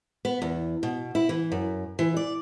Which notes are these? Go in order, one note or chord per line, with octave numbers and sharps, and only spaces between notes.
B3
E2
B2
E4
E3
F#2
E3
D5